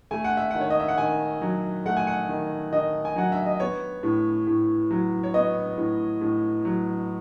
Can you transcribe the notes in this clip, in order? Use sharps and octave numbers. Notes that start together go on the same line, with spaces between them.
A3 G#5
F#5
E5
D#3 F#5
C#5
D#5
E5
F#5
D#3 G#5
F#3
A3 F#5
G#5
F#5
D#3
D#3 D#5
G#5
F#3 F#5
E5
D#5
B3 C#5
A2
A2
F#3
C#5
B3 D#5
A2
A2
F#3